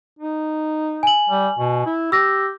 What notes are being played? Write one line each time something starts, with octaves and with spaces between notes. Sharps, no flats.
D#4
G#5 F#7
G3
B2
E4
G4 E6 A#6